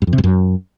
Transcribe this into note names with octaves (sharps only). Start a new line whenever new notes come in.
G2
F2
C3
G2
F#2